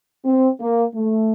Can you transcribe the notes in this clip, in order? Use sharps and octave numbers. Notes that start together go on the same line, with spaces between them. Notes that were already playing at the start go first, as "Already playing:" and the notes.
C4
A#3
A3